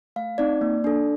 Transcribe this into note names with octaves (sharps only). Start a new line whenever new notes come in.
A3 F5
C4 D#4 D5
A#3
D4 A4